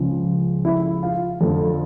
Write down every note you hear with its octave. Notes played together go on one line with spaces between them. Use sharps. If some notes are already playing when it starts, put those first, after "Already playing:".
Already playing: C#2 C#3 F3
E4
F4
F2 D3 F3 A4